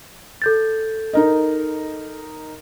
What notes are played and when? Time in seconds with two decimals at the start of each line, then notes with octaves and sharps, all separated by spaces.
0.42 A4 G6 A6
1.13 D#4 A#4 D#5